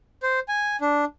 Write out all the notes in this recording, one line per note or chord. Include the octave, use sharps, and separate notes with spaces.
C5
G#5
D4